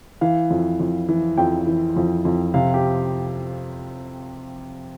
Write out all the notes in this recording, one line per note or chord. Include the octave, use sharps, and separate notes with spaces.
E3 F5
F2
F2
E3
F2 G5
E3
F2
F2
C3 F5
G4